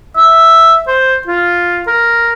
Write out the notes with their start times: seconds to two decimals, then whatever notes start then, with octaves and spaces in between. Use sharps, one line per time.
0.17 E5
0.88 C5
1.27 F4
1.87 A#4